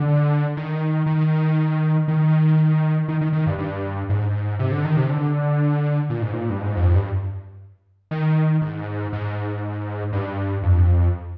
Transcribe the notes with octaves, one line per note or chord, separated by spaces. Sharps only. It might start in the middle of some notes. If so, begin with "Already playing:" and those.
Already playing: D3
D#3
D#3
D#3
D#3
D#3
D#3
G2
G2
G#2
C3
D3
D#3
C3
D3
A#2
G#2
A#2
G2
G#2
F2
G2
D#3
G#2
G#2
G2
F2